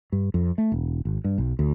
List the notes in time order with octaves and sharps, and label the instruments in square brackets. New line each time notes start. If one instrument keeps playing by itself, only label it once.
[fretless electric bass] G2
F2
A3
E1
G#1
G2
B1
D2